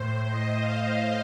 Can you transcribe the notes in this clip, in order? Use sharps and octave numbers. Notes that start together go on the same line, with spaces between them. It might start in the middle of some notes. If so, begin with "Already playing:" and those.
Already playing: A2 C5
D#5
F5